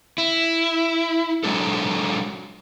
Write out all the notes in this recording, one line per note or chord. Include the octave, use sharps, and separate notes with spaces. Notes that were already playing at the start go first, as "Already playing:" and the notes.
E4
F#3 G#3 D4 A4